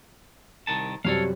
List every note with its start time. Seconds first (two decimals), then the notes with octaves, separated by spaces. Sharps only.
0.67 C2 D#3 A5
1.05 F#2 C3 G3 A4 C#5 F5